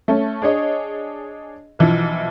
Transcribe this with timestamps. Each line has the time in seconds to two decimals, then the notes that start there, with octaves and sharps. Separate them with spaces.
0.08 A3 C#4
0.42 D4 G#4 C#5 D#5
1.79 B1 E3 F3